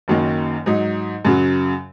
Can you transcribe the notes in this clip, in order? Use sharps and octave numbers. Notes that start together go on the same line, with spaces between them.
F#1 F#2 D#3 F#3 A#3
G#2 F#3 D#4
F#2 C#3 F#3